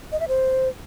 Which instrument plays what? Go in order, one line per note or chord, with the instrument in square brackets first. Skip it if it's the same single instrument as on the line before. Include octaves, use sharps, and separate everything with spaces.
[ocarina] D#5
E5
C5